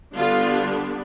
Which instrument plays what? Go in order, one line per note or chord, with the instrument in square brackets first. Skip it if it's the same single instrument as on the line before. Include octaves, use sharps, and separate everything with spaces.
[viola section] D3 G3 B3 D4 F4